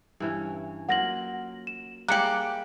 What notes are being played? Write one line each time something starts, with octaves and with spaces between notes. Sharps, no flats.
G2 E3 C#4
F#3 A#3 F4 F#5 A#6 F#7
E7
G3 G#3 A#3 G4 F#6 C#7 F#7